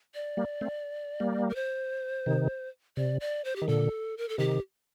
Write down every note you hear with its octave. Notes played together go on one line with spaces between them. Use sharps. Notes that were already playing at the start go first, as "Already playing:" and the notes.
D5
G3 A#3
A3 C4
G3 A#3
A#4
C5
C3 D#3
C3 D5
D5
C5
G4
D#3
A#2 D3 A4
A#4
A4
C3 D#3 G4